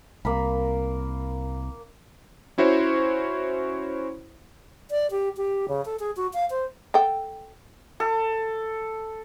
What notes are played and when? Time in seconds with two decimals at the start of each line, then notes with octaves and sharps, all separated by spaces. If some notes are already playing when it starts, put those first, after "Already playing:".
0.25 C2 A#3 A#4 B5
2.58 C#4 E4 F#4 C5 C#5
4.90 D5
5.11 G4
5.37 G4
5.69 C#3
5.85 A4
6.00 G#4
6.17 F#4
6.34 F5
6.50 C5
6.94 A4 F#5 G5
8.00 A4